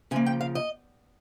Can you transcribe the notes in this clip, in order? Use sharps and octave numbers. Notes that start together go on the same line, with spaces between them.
C#3 F3 A#3 G#5
G5
F5
D#5